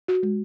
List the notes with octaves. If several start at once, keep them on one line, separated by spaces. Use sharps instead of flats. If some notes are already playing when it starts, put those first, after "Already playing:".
F#4
G#3